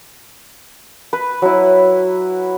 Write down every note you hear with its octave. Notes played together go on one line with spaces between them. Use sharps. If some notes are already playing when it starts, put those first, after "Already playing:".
B4
F#3 E4